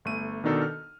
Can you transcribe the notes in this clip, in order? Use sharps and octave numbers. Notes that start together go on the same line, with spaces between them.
G1 A3 D#7
B2 D#3 D4 D#4 A4
F6